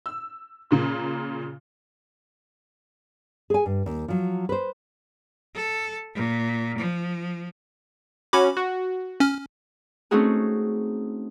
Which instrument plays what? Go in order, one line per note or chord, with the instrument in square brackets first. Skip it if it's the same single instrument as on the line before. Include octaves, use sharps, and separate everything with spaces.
[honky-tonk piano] E6
A#2 C#3 A#3
[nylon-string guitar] G#4 G#5
G2
D#2
F3 F#3
B4 C5
[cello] A4
A#2
F3
[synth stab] C#4 F#4 [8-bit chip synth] B5 D6
[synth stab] F#4
[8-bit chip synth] C#4 F6
[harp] A3 C4 C#4 D#4 F#4 G#4